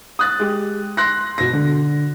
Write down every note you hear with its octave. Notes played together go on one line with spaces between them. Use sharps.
D#6 F#6 A6
G#3 G4
C6 F#6 A#6
B2 A#6
D3